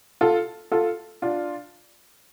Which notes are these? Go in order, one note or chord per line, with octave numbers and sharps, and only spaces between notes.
F4 A4
F4 A4
D4 F4